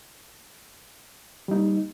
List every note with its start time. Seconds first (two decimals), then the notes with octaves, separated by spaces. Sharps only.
1.48 G3
1.51 D#4
1.54 A#3